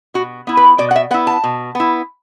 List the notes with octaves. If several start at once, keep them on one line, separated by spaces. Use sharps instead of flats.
B2 F#4
B3 E4
B4
B2 D5
F#5
E5
B3 E4 F#5
A5
B2
B3 E4